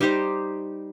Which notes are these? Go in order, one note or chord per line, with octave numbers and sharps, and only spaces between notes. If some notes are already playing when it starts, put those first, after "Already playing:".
G3 D#4 G4 C5